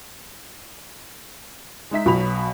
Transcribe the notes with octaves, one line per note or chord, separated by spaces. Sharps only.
G#3 D#4 E5 B6
B1 B2 F#3 B5 F7